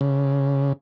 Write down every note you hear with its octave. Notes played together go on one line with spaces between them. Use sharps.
C#3